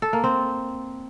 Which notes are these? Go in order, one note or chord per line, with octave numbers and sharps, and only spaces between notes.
A4
A#3
C4